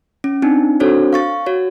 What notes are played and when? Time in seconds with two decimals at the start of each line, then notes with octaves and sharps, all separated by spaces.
0.24 C#4
0.42 C4 D4 D#4
0.80 C4 D4 F#4 A4 C5 C#5
1.13 F5 C#6 A6
1.46 F#4 C#5